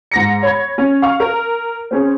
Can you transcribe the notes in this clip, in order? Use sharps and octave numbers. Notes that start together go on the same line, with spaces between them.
G#2 A#6 C#7
C#5 B5 G#6
C#4
F5 C#6 F6
A#4
C4 C#4 G#4